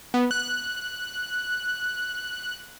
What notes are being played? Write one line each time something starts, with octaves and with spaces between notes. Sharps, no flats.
B3
F#6